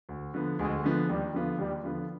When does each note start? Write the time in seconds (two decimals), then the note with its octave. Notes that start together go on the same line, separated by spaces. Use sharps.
0.09 D2
0.34 D3 F3 B3
0.59 D2 G#3
0.84 D3 F3 B3
1.09 D#2 G3
1.33 D3 F3 B3 F4
1.58 D#2 G3
1.84 D3 F3 B3 F4